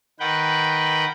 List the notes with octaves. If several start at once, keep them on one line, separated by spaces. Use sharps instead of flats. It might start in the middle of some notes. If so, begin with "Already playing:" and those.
D#3 B4 F#5 G5